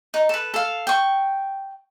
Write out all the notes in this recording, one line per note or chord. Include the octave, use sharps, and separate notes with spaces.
D#4
A4 B4
A4 F5
G5 C#6